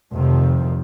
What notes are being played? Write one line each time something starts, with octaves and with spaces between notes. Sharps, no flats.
F1 C3 D#3 F3